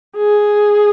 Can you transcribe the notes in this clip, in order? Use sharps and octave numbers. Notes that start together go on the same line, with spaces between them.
G#4